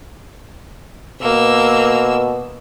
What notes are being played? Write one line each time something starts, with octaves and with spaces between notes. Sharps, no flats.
B2 A#3 E6